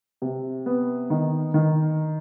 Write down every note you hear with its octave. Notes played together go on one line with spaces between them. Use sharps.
C3
B3
D#3
D#3